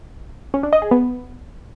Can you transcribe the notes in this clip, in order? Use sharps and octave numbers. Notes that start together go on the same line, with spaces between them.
C#4
D4
D#5
G#4
B3